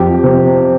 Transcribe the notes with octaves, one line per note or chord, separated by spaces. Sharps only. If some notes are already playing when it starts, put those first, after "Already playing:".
Already playing: F2 G4
C3